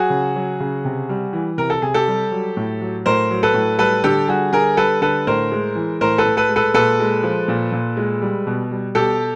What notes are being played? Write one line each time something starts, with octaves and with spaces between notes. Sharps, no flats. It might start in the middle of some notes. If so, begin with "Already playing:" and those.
Already playing: F#3 F#4 G#4
C#3
F#3
C#3
C3
G3
E3
C3 A#4
A4
C3 G#4
G4 A4
G3
F#3
A2
F#3
A2 A#4 C5
F#3
A4 B4
A2
G3 A4 B4
D3 G4 A4
G3 F#4 G#4
D3 G#4 A#4
G3 A4 B4
D3 A4 B4
A2 A#4 C5
G#3
E3
A2 A#4 C5
A4 B4
A2
A4 B4
G#3
A4 B4
A#2 A4 B4
G#3
F3
A#2
A#2
G#3
G3
B2
G3
B2 G4 A4